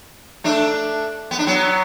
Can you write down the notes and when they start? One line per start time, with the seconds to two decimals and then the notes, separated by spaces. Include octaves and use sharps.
0.44 A3 D4
1.31 B3
1.39 D4
1.47 F#3 B3